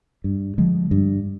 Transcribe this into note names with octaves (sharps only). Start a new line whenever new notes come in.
G2
D3 F3 G#3
G2